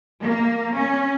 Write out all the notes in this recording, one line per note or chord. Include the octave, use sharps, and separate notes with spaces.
A#3
C#4